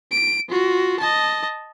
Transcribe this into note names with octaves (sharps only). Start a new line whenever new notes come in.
D7
F4 F#4
D#5 A5